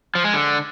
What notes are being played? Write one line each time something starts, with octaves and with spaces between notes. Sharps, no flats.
F3
G#3
D3